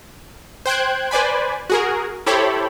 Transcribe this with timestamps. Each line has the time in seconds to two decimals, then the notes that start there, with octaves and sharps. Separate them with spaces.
0.66 C5 G5 F#6 G#6
1.11 B4 C5 D5 G#5 B5
1.70 F#4 G#4 A#4
2.26 E4 G4 A4 C5 C#5 B5